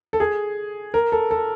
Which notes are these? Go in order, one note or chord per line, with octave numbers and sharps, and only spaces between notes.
A4
G#4
A#4
A4
A4